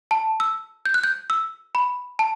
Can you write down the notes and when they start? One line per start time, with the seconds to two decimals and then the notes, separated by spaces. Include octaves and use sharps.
0.11 A5
0.40 E6
0.85 G6
0.94 F#6
1.04 G6
1.30 E6
1.75 B5
2.19 A5